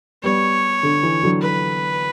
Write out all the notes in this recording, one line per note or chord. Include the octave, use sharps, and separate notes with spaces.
G3 B3 C#5
D3
E3
D3 F#3
B4